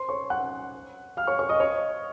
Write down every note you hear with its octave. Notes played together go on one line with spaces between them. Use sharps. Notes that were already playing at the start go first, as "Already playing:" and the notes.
Already playing: C5 C6
C#5 C#6
F#5 F#6
F5 F6
C#5 C#6
C#5 C#6
D#5 D#6
C#5 C#6